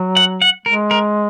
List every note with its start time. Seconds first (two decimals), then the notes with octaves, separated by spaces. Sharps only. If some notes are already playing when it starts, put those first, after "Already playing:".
Already playing: F#3
0.17 F#5
0.42 F#5
0.66 G#3 A#4
0.91 A#4